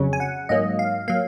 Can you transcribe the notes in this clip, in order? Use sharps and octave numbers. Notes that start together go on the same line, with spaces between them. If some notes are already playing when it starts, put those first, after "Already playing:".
Already playing: F2 C#3 F#3 C#4
G#5
F#5
G#2 F#3 A#3 D#5
F5
F#3 A#3 F5